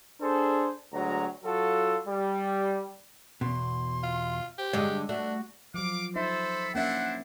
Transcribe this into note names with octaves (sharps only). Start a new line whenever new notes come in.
D4 G#4 A4 C5
D2 F#3 G#3 A#5
F#3 F4 F#4 A4
G3
E2 B2 C6
F4
G4 C5
G2 D3 G#3 C#5 D#5 D6
A3 D4 F#4
F3 F#3 F5 D6
D#4 A4 C5 E5 B5
A#3 C#4 D4 E4 C5 E5 F#5